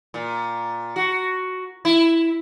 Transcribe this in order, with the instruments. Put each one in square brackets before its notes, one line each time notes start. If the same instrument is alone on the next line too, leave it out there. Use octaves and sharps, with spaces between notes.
[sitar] A#2
F#4
E4